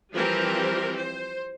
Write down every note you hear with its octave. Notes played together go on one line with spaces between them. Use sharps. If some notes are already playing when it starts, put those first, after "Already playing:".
E3 F3 G3 C4 G4 A#4
C5